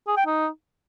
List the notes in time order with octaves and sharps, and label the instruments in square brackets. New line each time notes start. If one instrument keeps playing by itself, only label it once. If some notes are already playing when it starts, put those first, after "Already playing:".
[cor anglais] G#4
G5
D#4